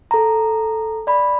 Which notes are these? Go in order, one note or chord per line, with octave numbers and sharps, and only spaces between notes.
A4 A#5
D5 B5